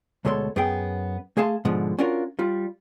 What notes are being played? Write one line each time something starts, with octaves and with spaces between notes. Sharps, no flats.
D2 B2 G#3 A4 C#5 C6
F#2 B3 G#4 G5
A3 G#4 F5 A5 C6
G#2 B2 D3 F3 G#3
C#4 D4 F4 F#4 A#4
G3 F4